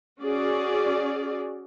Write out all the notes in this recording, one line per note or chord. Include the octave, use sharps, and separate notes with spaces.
C#4 F#4 G#4 D5